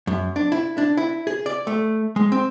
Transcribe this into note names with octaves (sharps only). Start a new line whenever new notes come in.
F#2
D4
E4
D4
E4
G#4
D5
A3
G#3
C4